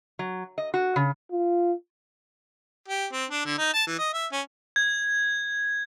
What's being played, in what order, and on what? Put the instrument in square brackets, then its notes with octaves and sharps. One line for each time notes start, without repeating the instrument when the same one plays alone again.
[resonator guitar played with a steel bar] F#3
D#5
F#4
C#3
[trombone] F4
[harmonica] G4
C4
D4
D3
D#4
A5
E3
D#5
E5
C#4
[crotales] G#6